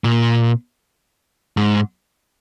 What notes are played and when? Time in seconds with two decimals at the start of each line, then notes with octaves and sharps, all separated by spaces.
0.04 A#2
1.57 G#2